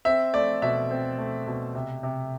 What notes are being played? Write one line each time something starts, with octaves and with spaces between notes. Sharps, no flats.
C4 E5
A3 D5
B2 E5
C4
A3
B2
C3
C3